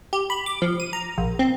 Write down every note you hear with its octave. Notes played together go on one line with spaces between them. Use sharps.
G4
B5
D6
F3
D#7
A#5
A#1
C4